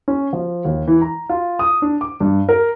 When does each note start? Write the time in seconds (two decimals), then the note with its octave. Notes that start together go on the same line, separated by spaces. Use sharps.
0.08 C#4
0.33 F3
0.65 D#2
0.88 E3
1.01 A#5
1.29 F4
1.59 D#6
1.82 D4
2.01 D6
2.20 G2
2.49 A#4